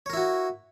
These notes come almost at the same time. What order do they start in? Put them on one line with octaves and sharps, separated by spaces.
C#5 A#4 E4 F#4